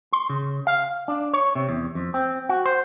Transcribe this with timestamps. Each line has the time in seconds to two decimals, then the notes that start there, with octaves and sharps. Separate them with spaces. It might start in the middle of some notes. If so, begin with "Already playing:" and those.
0.13 C6
0.30 C#3
0.67 F5
1.08 D4
1.34 C#5
1.55 C3
1.69 E2
1.95 F2
2.14 C4
2.49 F#4
2.66 C5